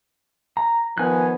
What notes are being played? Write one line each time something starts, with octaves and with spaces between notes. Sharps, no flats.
A#5
D#3 F3 B3 G#5 F#6